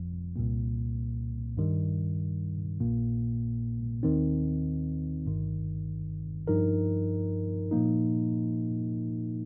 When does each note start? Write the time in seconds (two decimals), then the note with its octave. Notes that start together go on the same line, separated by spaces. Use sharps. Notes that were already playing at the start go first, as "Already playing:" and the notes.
Already playing: G1 F2 F3
0.36 C2 A#2 A#3
1.57 G2 D#3 G3
2.80 A#1 A#2 A#3
4.03 D#2 D#3 C4 D#4
5.26 G1 G2 D#3
6.47 G2 F3 D#4 A#4
7.71 A#2 F3 A#3 D#4